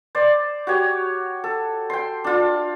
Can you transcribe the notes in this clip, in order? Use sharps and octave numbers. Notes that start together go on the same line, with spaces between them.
C5 D5
F#4 G4 C#5
A4
G5 C6
D4 F4